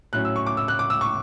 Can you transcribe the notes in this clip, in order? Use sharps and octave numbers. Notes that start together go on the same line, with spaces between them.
A2 F#3 C#4 F#6
E6
C#6
D6
E6
F#6
D6
E6
C#6